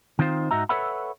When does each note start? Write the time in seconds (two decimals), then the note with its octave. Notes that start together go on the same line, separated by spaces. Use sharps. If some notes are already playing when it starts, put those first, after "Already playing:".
0.19 D#3 C4 D#4 F4 C5
0.51 G#2 D#4 F#4 E5 A#5
0.69 A4 B4 C#5 E5 F#5 B5